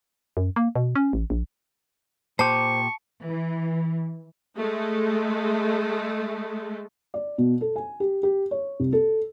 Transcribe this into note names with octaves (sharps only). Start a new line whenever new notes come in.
F#2
A#3
B2
C#4
A1
A#1
A#2 G4 C5 A5 C#6
E3
G#3 A3
D5
B2
A4
G#5
G4
G4
C#5
C2
A4